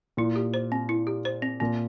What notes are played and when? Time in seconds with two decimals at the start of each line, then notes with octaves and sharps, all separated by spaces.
0.17 A#2 E4
0.36 G4
0.54 C5
0.72 C4
0.89 E4
1.07 G4
1.25 C5
1.42 C4
1.60 A#2 C4